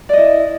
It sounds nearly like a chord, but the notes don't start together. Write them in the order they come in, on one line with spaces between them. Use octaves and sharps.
D5 D#5 E4